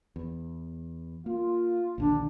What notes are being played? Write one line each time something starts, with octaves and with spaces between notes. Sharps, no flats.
E2
A#3 F4
A#1 D#2 D3 D4